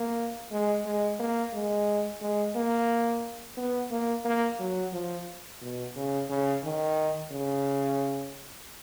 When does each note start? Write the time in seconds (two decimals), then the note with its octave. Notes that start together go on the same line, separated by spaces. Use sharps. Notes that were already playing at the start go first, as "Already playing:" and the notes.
Already playing: A#3
0.51 G#3
0.85 G#3
1.20 A#3
1.53 G#3
2.21 G#3
2.56 A#3
3.57 B3
3.91 A#3
4.25 A#3
4.60 F#3
4.93 F3
5.61 B2
5.96 C#3
6.30 C#3
6.64 D#3
7.32 C#3